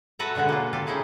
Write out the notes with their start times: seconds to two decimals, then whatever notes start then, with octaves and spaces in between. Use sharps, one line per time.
0.19 F#4 A4 B4 E5 F#5 A#5
0.35 B2 D3 G#3 F#4 C#5
0.49 A#3 F4
0.73 F4 G4 A4 F5
0.87 C#4 D#4 E4 G#4